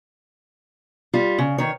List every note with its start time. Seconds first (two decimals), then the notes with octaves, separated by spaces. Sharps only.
1.13 G3 F4
1.38 C#3
1.58 D#3 C#5